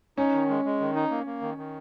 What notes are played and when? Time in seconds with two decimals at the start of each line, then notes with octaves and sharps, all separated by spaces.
0.18 C#4 D#4
0.34 D#3
0.49 G#3
0.65 G#3
0.80 D#3
0.95 D#4
1.10 A#3
1.26 A#3
1.42 D#3
1.58 D#3